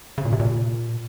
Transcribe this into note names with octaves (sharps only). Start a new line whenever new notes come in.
C#3
A#2
C3
A#2